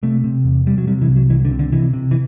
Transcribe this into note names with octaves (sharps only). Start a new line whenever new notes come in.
C3 A3
C3
E2
C3 G3
F#3
C3 G3
E3
C2
F#3
C2 E3
D3
C3
D3
C3 E3
C3
E3